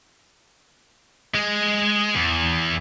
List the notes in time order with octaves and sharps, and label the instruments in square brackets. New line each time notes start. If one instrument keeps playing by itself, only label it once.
[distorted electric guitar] G#3
E2